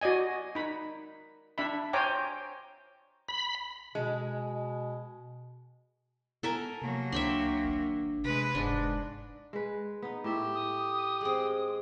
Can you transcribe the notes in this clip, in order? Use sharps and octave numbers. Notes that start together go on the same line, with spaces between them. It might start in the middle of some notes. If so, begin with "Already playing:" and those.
F#4 D5 D#5 G#5
D#4 B5
D4 E5 B5
C5 C#5 G5 G#5 A#5 D6
B5
B2 G#3
B3 A4 A#4 G#5
C3 F#3 A#3
C#2 D4 E5 G5 C6
G#1
C3 G#3 B4
F1 G#2 D4 D5
G#3 B4
B3 D#4
A2 G4 E5
D#6
G#3 C4